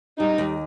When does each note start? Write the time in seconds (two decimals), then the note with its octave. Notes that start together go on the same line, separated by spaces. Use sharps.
0.20 G3 D#4
0.38 D#2